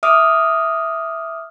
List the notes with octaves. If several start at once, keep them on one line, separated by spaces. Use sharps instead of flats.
E5 D6 D#6 F6